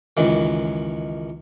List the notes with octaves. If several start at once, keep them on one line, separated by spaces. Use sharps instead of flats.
C#2 F#2 D#3 E3